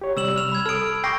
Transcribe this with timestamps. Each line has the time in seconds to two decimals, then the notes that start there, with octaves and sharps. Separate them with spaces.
0.01 G4 C#5
0.17 C3 G3 E6 E7 F#7
0.36 F6 F7
0.52 B5 G#6
0.66 A4 D#6 F6 D7
1.04 G5 C#6 D6 G6 A#6 C7